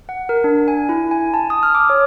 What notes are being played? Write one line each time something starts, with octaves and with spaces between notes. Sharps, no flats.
F#5
A#4
D4
G#5
E4
G#5
A5
D#6
F6
D6
C#5